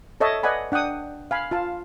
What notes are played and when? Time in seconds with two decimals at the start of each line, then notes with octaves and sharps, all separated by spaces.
0.20 A4 C#5 D#5 E5 A5
0.43 B4 D5 D#5 F#5 G#5 B5
0.72 D4 F#5 G5 D#6
1.31 F5 G#5 B5
1.51 F4 F5 A5